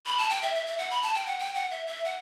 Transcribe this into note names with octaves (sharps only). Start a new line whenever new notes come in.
B5
A5
G5
E5
E5
E5
F#5
B5
A5
G5
F#5
G5
F#5
E5
E5
F#5